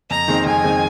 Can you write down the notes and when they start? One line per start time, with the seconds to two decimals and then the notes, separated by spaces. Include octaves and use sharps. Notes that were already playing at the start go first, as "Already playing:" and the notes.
0.10 F2 A#5
0.28 D#3 G#3 C4
0.46 F2 G#5
0.64 D#3 G#3 C4